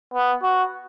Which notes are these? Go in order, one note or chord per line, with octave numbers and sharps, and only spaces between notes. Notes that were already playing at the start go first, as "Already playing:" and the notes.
B3
F#4